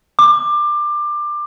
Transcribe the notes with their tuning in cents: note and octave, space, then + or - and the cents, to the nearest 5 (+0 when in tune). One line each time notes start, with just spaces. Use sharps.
D6 +20